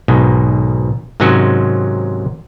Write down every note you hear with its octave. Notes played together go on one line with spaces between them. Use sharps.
B1 G#2 B2 D#3
G#2 C3 D#3 F#3 C#4 F#4